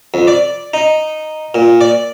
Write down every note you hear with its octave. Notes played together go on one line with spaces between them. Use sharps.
F2
D5
D#4
A#2
D5